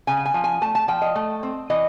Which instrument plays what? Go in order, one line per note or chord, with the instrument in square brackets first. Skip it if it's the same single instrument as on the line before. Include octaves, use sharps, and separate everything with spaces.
[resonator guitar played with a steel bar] C#3 G#5
G#5
F3
G#5
A3 A5
A5
F3 G5
D#5
A3
C4
E3 D#5